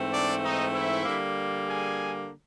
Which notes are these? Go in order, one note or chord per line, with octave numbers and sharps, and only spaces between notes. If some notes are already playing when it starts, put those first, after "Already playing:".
Already playing: G#2 E3 A3 C4
D4 D5
D#4 D#5
E4 E5
D3 G3 A#3
G#4 G#5